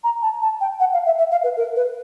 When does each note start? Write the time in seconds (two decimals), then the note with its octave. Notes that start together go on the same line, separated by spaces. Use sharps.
0.04 A#5
0.22 A5
0.42 A5
0.61 G5
0.80 F#5
0.93 F5
1.06 E5
1.18 E5
1.31 F5
1.44 B4
1.57 A#4
1.76 B4